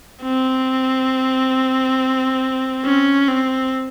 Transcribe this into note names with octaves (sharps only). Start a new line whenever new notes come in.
C4
C#4
C4